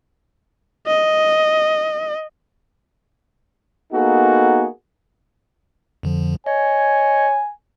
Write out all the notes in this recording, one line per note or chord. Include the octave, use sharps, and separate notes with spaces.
D#5
A#3 B3 D#4 F#4 G#4 A4
F2 D3 F3
C#5 D#5 G#5